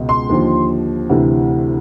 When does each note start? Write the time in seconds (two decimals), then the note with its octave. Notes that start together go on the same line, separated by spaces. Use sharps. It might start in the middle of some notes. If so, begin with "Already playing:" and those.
Already playing: C#2 B2
0.09 C6
0.29 D#2 D3 F3
1.09 D2 C3 E3